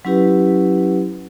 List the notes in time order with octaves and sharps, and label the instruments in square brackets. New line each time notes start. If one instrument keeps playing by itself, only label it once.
[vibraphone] F#3 C#4 E4 G4 B4